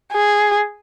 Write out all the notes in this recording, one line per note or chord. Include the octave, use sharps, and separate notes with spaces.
G#4